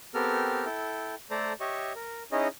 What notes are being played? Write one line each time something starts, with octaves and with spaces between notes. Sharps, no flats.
B3 C4 G4 A4 A#4 F6
E4 A4 G5
A3 A4 C5 D5 A#5
G4 C#5 D#5 E5 C#6
A#4
C#4 D#4 E4 G#4 C#5 D#5